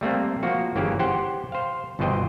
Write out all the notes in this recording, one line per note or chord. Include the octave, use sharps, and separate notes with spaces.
G3 A3 A#3 C4
F3 A#3 F#4
G1 E3 A#3 C#4 G4 G#4
G4 C5 F#5 G5
C5 F5
G1 B2 E3 C5 D#5 G5